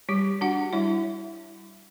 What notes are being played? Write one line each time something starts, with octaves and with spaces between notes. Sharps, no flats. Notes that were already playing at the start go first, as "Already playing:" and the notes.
G3 G4
D4 F#4 F#5
G3 E4 E5